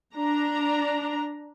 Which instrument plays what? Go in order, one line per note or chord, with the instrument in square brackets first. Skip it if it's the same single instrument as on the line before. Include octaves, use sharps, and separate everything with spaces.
[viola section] D4 A#5